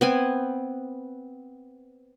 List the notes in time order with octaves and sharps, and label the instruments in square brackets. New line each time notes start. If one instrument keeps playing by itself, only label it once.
[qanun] B3 C4 G#5